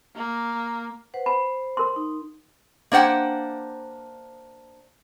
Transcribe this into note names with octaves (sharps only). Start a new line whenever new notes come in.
A#3
B4 C5 F#5
C5 B5
A#4 C6
D#4
A#3 D4 C5 F#5 G5